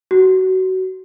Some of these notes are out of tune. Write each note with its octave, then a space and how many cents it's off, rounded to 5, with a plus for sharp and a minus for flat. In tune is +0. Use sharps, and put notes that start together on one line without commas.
F#4 +20